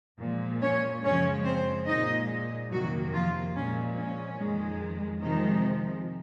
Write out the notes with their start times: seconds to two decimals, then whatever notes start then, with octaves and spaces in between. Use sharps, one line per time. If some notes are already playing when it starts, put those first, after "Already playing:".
0.20 A#2 F3 G#3
0.62 C#4 C#5
1.03 F#2 C#3 F3 G#3 C#4 C#5
1.45 C4 C5
1.87 A#2 G#3 D#4 D#5
2.71 F2 C3 D#3 F#3 A#3 F#4
3.13 F3 F4
3.54 A#2 F3 G#3 C#4
3.96 C#4
4.39 F2 D#3 G#3
5.22 C3 D#3 F3 G#3 D#4